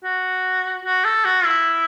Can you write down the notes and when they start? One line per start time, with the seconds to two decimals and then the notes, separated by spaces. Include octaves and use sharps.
0.04 F#4
0.85 F#4
1.05 A4
1.25 F#4
1.45 E4